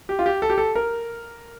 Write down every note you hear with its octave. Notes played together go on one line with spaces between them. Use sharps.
G4
F4
G4
A4
G4
A4
A#4